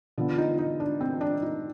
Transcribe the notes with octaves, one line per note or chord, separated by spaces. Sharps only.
D3 F3 B3
F4
D#4
D#4
D4
C4
D4
D#4